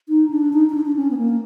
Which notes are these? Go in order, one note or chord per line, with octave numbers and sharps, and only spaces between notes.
D#4
D4
D#4
D#4
D4
D4
C#4
B3
A#3